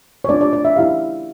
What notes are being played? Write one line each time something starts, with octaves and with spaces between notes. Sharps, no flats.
C#5
A3 D4 F4 D5
D5
D5
E5
C#4 E4 G4 F5